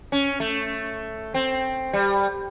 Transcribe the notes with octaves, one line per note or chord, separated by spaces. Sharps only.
C#4
A3
C4
G3